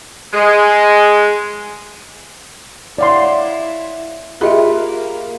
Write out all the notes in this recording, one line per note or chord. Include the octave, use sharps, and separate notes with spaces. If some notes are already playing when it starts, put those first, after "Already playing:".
G#3
E4 C#5 D5 F5 F#5 C6
A#3 F4 G4 G#4 D#5 E5 B5